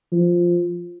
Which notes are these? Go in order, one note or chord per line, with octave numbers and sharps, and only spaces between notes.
F3